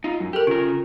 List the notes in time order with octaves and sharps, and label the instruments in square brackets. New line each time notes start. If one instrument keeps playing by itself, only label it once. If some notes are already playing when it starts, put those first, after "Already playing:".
[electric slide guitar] D#4 F4
F#2
[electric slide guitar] G4 [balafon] A4 A#4
[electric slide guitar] C#3 A#4 [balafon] F4